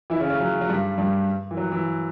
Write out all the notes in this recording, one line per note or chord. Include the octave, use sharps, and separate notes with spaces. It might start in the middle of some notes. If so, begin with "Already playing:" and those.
E3 E4
C#3 C#4
C#3 C#4
F#3
F#3
G2 G3
G2 G3
E3
F#3
E3